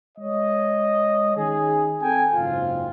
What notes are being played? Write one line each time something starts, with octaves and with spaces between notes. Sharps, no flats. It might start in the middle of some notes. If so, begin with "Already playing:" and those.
G#3 C#5 D#5
D#3 C#4 G#4
C4 A4 G5 G#5
F#1 G#2 C4 F4